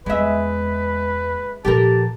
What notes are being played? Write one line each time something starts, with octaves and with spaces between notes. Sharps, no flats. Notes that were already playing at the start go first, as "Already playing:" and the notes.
E2 G#3 A#3 B4 E5
A#2 F3 G4 A4 A#4 A5